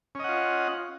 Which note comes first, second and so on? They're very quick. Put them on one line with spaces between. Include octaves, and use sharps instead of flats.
C#4 D#5 F#5 F4